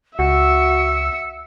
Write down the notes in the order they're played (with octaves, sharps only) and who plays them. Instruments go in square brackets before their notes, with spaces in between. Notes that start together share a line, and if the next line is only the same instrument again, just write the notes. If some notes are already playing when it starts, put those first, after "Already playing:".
[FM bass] C#2 [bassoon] F#4 [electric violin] E5 E6 [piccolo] C#7